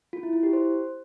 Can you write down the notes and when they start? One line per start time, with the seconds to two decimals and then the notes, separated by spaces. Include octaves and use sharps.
0.13 F4
0.23 E4
0.33 E4
0.43 G4
0.53 C5